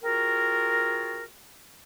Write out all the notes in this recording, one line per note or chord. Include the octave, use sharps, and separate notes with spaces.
C4 F4 F#4 G#4 A#4